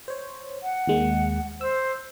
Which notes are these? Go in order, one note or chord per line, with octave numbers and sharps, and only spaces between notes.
C5 C#5
F#5
D#2 G#3 A#3
C5 E6